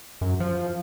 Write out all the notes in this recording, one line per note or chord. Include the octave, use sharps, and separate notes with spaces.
F#2
F3